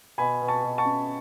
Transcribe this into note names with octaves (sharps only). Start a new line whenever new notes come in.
B2 G#5 B5
B2
A5 C#6
B2
A5 C#6
C#4